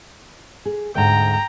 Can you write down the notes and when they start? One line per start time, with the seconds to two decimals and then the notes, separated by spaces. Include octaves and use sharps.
0.65 G#4
0.95 D2 G#2 G5 A#5